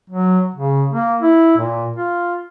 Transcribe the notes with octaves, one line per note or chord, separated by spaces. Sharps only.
F#3
C#3
A#3
E4
A#2
F4